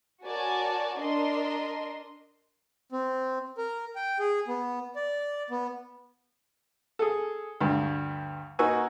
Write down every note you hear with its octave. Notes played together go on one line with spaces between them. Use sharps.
F#4 A#4 C#5 D5 G#5 A5
D4 A#4 D#5 C6
C4
A#4
G5
G#4
B3
D5
B3
G#4 A4
D2 G2
A#3 D#4 F#4 B4 G#5 E6